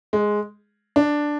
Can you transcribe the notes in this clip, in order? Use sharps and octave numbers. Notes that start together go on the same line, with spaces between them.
G#3
D4